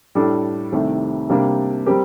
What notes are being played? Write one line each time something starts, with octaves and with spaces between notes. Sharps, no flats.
A2 G3 D4 A4
C2 C3 D#3 A3
C3 G3 A#3 D4 G4
G3 C4 G4 A#4